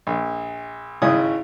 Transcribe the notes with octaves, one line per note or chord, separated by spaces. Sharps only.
A#1
G#1 C#3 G#3 E4 C#5 D#6